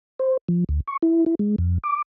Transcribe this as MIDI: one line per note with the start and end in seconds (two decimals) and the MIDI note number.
0.19 0.37 72
0.48 0.64 53
0.69 0.80 38
0.88 0.97 85
1.02 1.24 64
1.26 1.35 64
1.39 1.56 56
1.58 1.78 41
1.84 2.02 86